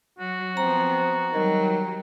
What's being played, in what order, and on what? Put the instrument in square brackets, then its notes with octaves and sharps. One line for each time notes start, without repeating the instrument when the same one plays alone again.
[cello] F#3 [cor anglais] F#4
[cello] F3 B3 [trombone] C4 [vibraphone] A#5
[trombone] D#3 [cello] F#3 G3